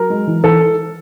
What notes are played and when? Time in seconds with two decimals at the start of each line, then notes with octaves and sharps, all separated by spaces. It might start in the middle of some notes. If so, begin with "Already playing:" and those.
Already playing: F#3 A#4
0.10 G#3
0.27 E3
0.44 E3 A4